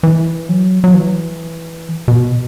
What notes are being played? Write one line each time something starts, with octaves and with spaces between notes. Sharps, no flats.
E3
F#3
F#3
E3
B2